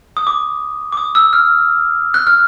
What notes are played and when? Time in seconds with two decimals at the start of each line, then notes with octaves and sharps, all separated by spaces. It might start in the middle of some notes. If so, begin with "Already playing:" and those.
0.17 D#6
0.27 D6
0.92 D6
0.97 D#6
1.15 E6
1.33 F6
2.14 F#6
2.27 F6